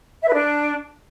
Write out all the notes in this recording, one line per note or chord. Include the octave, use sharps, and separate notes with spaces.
E5
B4
D4